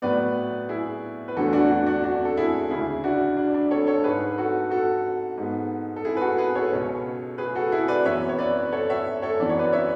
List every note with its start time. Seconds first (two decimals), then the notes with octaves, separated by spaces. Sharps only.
0.02 A2 F#3 B3 B4 D5
0.69 E4 G#4
1.28 B4
1.37 E2 D3 A3 C#4 F#4 A4
1.53 D4 F#4
1.69 D4 F#4
1.86 D4 F#4
2.04 D4 F#4
2.25 A4
2.37 E4 G#4
2.70 D2 C#3 G#3 E4 G#4
3.04 D4 F#4
3.37 D4
3.54 D4
3.71 A4 C#5
3.87 A4 C#5
4.04 G#2 G#3 C#4 G#4 B4
4.38 F#4 A4
4.71 F#4 A4
5.38 G#2 G#3 B3
5.96 A4
6.05 E4 G#4
6.17 B4
6.21 F#4 A4
6.38 G#4 B4
6.55 A4 C#5
6.72 C#2 B2 G#3 C#4
7.38 G#4 B4
7.55 F#4 A4
7.72 E4 G#4
7.88 B4 D5
8.05 F#2 E3 B3 C#5 E5
8.29 C#5
8.38 B4 D5
8.72 A4 C#5
8.90 C#5 E5
9.22 A4 C#5
9.40 F#2 E3 B3 D5
9.49 C#5
9.59 B4 D5
9.73 C#5 E5